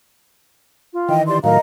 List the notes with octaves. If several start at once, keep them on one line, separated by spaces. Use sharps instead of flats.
F4
D#3 E3 D#5 G5
G4 D5 C6
A2 D#3 F#3 A#4 D#5 F5 A#5